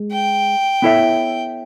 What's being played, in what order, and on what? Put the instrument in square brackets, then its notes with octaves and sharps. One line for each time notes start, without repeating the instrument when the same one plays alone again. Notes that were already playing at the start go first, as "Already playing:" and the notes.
Already playing: [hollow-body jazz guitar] G#3
[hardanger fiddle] G5
[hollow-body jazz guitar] B3 E4 A4 C#5 E5